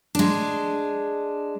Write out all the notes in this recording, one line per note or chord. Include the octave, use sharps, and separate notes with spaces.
G#3 D4